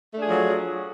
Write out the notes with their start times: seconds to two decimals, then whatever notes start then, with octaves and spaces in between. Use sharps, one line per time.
0.14 A3
0.18 D4
0.21 G#4
0.25 F3
0.29 F#3